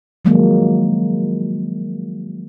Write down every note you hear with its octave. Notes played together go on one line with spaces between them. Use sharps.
D#3 F3 F#3 G#3 A#3